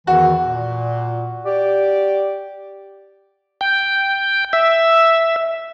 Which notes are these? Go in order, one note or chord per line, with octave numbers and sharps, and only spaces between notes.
E2 D#3 E3 F#4
A#2
G4 D5
G5
E5